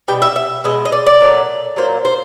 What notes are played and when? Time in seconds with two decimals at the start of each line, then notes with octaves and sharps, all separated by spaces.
0.08 B2 G3 G5
0.22 E5
0.36 E5
0.64 B2 G#3 D#5
0.85 D#5
0.92 D5
1.06 D5
1.21 A#2 F#3 A3
1.76 A#2 F#3 A#3 C5
2.05 C5